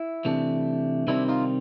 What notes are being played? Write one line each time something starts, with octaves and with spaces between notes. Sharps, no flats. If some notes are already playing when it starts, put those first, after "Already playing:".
Already playing: E4
C3 E3 A3 D4
C3 D#3 G3 C4 D4 E4
D#4 F4